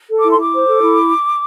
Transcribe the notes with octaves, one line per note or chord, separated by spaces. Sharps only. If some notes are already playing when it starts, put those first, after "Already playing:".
A4
E4 D6
C6
E4 D6
C5
A4
E4